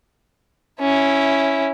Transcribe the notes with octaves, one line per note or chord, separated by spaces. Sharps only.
C#4 E4